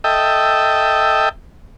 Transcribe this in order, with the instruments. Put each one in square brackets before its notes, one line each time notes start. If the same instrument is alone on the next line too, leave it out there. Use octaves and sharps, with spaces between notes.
[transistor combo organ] A4 D#5 E5 G5